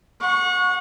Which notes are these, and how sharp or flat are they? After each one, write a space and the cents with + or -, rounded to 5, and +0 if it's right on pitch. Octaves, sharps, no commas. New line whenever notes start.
F#5 -35 C#6 +0